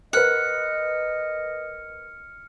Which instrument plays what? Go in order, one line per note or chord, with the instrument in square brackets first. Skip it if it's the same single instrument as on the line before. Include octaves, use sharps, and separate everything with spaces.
[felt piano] A#4 B4 [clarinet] D#5 [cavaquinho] F#5 [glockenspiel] F6 C#7